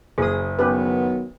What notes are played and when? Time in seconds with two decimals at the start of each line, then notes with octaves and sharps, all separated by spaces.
0.18 F#1 G#4 D#6
0.59 D#3 F#3 B3 C#4 G4 B4